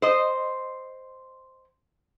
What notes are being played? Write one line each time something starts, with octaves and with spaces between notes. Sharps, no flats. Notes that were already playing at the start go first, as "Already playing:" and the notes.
C5 D#5